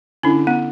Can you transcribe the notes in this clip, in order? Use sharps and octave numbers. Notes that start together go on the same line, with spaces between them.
D3 C#4 E4
B3 D4